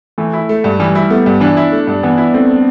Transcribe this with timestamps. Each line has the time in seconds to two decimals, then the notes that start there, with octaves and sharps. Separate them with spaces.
0.18 E3 A3
0.33 E4
0.49 A3
0.64 G2
0.79 E3 G3
0.95 E4
1.10 A3 B3
1.26 G2
1.41 E3 D4
1.57 E4
1.72 A3
1.87 G2
2.03 E3 B3
2.18 E4
2.34 A3 C4